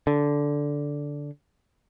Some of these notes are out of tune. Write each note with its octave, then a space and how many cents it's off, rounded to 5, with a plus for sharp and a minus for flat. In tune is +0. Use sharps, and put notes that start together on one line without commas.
D3 -10